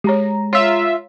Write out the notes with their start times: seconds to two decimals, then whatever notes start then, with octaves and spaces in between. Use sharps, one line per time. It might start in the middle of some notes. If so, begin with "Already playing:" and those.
0.04 G#3 G4 C#5 A#5
0.53 F4 C#5 E5 F5